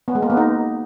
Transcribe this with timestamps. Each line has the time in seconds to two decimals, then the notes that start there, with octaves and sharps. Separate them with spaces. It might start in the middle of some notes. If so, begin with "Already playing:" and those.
0.08 B3
0.15 G#3
0.22 A#3
0.30 B3
0.37 D#4